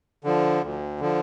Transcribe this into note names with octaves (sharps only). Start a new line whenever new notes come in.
D3 F3
D2
D3 F3